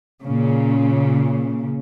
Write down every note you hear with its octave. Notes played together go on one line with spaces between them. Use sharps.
A#2 C#3